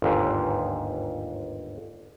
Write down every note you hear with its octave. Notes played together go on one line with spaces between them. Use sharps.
G1 D#2 G#2